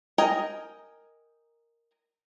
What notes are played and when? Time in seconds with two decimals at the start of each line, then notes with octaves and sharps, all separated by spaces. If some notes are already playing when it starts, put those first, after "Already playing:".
0.18 A#4 D#5 G5 G#5 A#5